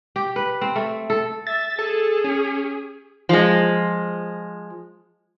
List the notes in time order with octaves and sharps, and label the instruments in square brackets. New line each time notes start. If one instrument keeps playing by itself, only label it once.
[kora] G4
B4
C4
A3
A4
[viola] E5 [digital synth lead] A6
[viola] G#4 [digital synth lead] A4
[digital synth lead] C#4
[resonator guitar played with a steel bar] F3 G#3